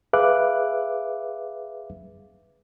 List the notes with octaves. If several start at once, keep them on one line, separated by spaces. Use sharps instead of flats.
G#4 B4 E5 F5 D6 F#6